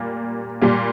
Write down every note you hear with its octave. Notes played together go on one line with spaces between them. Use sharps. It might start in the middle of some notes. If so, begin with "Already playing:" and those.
Already playing: A#2 G3 A#3
A#2 G3 A#3